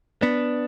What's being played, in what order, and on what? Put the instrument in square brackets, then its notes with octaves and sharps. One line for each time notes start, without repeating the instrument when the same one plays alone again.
[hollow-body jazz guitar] B3 [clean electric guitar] D4